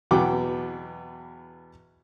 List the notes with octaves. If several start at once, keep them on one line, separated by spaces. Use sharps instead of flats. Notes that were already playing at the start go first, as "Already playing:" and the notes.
E2 B2 F#3 F#5 G5 D6